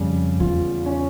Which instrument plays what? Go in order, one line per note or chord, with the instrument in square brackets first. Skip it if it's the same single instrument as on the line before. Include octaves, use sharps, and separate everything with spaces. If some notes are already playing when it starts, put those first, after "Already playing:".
Already playing: [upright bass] F2 [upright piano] C#3 G3
[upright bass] E2 [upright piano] F4
[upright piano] C#4